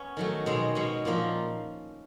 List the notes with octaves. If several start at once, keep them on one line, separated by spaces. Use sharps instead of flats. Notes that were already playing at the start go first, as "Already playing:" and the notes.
Already playing: B3 C#4
D#3 F#3 A3
B2 G#3 C4
B2 G#3 C#4
A#2 F3 A#3 D#4